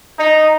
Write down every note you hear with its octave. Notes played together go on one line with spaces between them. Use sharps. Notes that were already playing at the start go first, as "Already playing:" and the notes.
D#4